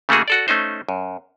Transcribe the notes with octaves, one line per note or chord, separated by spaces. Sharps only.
C#3 A3 A#3 F#4 G#4
F#4 A4 D5
A3 C#4 D#4 C5
F#2